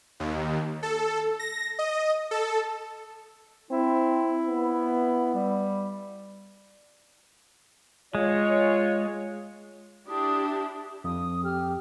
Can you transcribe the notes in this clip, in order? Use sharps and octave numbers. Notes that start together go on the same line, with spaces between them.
D#2
A4
A#6
D#5
A4
C4 E4
B3
G3
G#3 F4 C#5
D4 E4 G4 D#6
F2 D#6
G4 F6